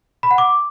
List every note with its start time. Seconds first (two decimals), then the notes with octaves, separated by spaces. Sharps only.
0.23 B5
0.31 F#5
0.38 D6